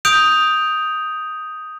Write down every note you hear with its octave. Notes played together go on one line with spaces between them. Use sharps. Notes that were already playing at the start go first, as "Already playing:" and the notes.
D#6 G6 D7 F7